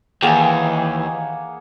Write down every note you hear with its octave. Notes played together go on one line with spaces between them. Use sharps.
D#2 E3 A#3 G#4 F#5 G5